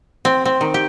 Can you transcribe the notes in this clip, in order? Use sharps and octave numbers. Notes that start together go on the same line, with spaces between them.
C4
C4
D#3
G4